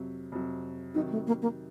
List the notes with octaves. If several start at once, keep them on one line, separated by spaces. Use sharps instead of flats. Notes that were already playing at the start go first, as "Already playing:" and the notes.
Already playing: F2 C3 F#3
F2 C3 F#3
C3 D#3 F#3 D#4
A3
A#3
A#3